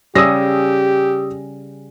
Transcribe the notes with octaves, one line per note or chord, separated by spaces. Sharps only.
C#3 G3 G4 G#4 D#6 E6 A#6